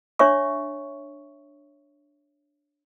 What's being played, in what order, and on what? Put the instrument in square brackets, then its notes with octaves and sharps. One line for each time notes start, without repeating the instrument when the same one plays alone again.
[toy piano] D4 C#5 E5 C#6